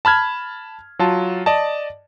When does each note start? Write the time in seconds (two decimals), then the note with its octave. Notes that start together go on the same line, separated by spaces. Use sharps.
0.05 A5 B5 F6 G#6
0.99 F#3 F4 A5
1.46 D5 D#5 A5